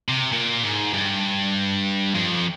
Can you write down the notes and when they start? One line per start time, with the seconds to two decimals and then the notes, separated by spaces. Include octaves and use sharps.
0.08 C3
0.32 A#2
0.63 G#2
0.93 G2
2.15 F2